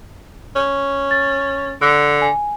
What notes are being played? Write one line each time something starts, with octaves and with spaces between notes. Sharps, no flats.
C#4
A6
D3 E6 F#6
G#5